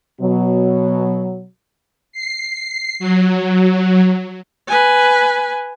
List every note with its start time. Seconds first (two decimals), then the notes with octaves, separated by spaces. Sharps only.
0.21 B2 F#3
2.13 C7
2.99 F#3
4.67 B4 G#5